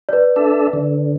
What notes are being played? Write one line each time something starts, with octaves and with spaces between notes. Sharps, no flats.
B4 D5
D4 A4 E5
D3